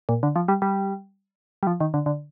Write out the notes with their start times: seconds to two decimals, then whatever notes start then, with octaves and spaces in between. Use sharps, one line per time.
0.09 A#2
0.23 D3
0.36 F3
0.48 G3
0.62 G3
1.63 G3
1.67 F3
1.80 D#3
1.94 D3
2.06 D3